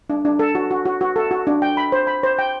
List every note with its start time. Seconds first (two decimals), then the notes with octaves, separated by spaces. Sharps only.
0.10 D4
0.25 D4
0.39 A4
0.55 F#4
0.71 F#4
0.85 F#4
1.01 F#4
1.16 A4
1.31 F#4
1.47 D4
1.62 G5
1.77 B5
1.92 C5
2.07 B5
2.23 C5
2.39 G5